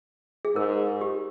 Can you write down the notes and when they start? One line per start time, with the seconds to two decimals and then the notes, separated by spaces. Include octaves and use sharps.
0.45 G#4
0.56 G#2 A#4
1.01 G4